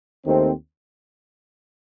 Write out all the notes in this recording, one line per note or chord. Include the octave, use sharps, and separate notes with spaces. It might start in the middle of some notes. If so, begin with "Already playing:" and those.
D#2 D#3 A3 C4